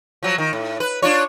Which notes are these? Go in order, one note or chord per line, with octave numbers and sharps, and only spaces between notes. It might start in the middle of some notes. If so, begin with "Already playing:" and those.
F3 F#3
D#3
A2
B4
D4 F4 C#5